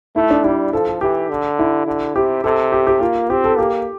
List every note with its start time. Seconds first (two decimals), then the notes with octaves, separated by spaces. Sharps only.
0.16 A3 E4
0.30 D4
0.44 G3 E4
0.73 F3 A4
0.87 A4
1.01 E3 G4
1.30 D3
1.59 E4
1.87 D3
2.15 C3 G4
2.44 C3 A4
2.72 G4
2.87 G4
3.01 A#3 F4
3.30 C4 G4
3.44 A4
3.58 A#3 G4